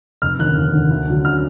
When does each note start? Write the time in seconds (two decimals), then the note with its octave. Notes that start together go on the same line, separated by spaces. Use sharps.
0.22 F1 F6
0.39 D#2 D3 F#6
0.56 F1
0.73 D#2 D3
0.90 D2
1.07 D3 F#3
1.24 D2 F6